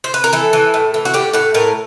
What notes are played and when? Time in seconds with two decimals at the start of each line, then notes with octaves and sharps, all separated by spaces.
0.04 C5
0.14 B4
0.24 A#4
0.33 E3 A4
0.53 E3
0.74 A2
0.94 E3
1.05 F#4
1.14 A2 G4
1.33 A2 F#4
1.54 A2 A#4